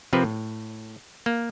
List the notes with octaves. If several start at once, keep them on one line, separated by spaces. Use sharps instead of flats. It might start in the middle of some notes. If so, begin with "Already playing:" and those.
C3 F3 C4 A#4 B4
A2
A#3